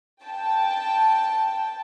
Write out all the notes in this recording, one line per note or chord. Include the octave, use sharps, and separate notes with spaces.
G5 A5